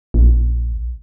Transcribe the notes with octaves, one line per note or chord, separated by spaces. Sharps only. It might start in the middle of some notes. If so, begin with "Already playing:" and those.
A#1